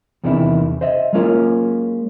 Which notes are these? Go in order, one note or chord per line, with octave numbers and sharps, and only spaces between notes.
E2 C3 D#3 E3 D4 E4
C5 D#5 E5
F#3 G#3 A#3 C#4 F4 A#4